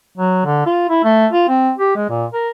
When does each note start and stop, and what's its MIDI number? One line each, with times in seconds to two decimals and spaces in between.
0.17 0.40 54
0.45 0.64 50
0.66 0.89 65
0.89 1.04 64
1.04 1.27 57
1.33 1.45 65
1.48 1.71 60
1.77 1.96 67
1.96 2.06 56
2.10 2.25 46
2.32 2.49 70